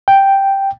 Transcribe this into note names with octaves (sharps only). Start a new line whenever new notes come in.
G5